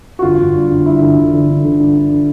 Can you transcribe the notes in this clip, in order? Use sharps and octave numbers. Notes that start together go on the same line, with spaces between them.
F#4
G1 F4
G1
G2
G1
G2 E4
D3
G1
D3
D3
D3
G2
G2
D3